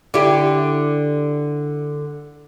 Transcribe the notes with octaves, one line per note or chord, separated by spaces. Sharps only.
D3 E4 G4